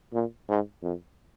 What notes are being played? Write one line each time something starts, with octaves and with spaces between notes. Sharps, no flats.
A#2
G#2
F2